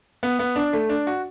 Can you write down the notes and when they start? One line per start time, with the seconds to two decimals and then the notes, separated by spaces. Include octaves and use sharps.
0.23 B3
0.39 B3
0.56 D4
0.73 A3
0.89 D4
1.07 F#4